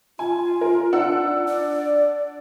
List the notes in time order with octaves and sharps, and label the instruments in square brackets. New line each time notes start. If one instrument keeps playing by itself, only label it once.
[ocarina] F4 [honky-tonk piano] G#5
[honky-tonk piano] A#4
D4 F#5 E6
[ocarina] D5